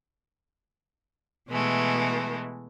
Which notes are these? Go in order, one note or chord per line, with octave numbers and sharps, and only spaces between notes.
B2 E3 G#3 A3